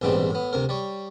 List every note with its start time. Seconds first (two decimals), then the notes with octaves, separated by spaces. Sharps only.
0.02 A#1 G#2 B2 E3 G3 C4
0.30 A2 B3
0.53 D2 C3 A#4
0.69 G3 C#5